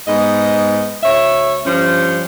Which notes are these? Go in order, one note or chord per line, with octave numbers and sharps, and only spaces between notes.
G#2 B3 D#5
D2 C#5 E5
G2 F3 C#4